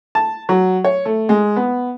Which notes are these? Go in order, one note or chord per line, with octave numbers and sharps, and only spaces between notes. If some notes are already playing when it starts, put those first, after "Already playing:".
A5
F#3
C#5
A3
G#3
B3